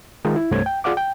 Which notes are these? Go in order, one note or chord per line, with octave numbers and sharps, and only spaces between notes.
D#3 G#3 D#4 F4
E4
C2 G2 A3 C5 C#5 G#6
G5
F4 G#4 D5 F5 F#5 D6
G5